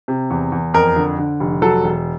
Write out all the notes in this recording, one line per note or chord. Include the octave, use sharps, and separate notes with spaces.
C3
E2
E2
F2 A#4
D3
D3
F1
F#3 A4
E1